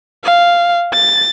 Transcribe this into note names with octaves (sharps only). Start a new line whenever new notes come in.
F5
A6